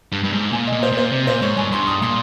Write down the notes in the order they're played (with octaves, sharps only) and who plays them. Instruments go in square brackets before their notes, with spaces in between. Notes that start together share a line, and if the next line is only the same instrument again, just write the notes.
[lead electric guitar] G2
G2
G#2
[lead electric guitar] A#2 [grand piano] G#5
[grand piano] D#5
[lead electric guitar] A#2
[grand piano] C5
[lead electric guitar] A#2
[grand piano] C5
[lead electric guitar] C3
[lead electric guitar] A#2 [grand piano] C5
[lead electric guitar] G#2 [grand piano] C#5
[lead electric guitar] G2 [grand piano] G#5
[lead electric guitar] G2 [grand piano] C6
[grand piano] D#6
[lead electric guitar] A#2 [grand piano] C6